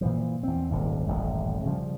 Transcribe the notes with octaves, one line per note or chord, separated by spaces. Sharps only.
A#2 E3 F3
E2 C4
D#1 G#1 D#2
D#1 A1 F#2 A3
C#3 F3 G3